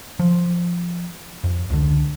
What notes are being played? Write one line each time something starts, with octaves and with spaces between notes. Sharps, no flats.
F3
F2
C#2 D3